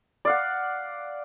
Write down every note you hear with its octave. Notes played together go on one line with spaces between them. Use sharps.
D5 F5 F#5